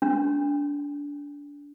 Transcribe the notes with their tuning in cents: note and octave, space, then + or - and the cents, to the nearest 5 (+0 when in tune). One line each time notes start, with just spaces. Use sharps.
D4 -25